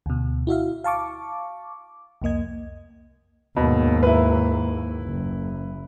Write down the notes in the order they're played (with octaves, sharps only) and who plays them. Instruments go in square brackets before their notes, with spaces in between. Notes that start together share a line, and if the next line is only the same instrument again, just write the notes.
[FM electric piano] D2 B2
E4 F#4 E5 F5
F5 A5 C#6 D6
C2 F2 A#3 D#5 G#6
[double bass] D#2 G#2 [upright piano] B2
[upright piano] E4 B4
[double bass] F#1